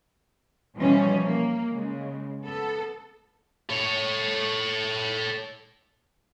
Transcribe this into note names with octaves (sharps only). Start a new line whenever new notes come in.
B2 E3 F3 G3 C#4
A#3
C#3 G#3
B3 A4
A4 C#5